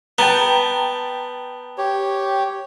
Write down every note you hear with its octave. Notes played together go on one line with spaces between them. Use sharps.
B3 G5 A5 A#5
G4 C#5